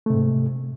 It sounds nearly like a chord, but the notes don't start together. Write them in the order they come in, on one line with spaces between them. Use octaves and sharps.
A3 C3 G#2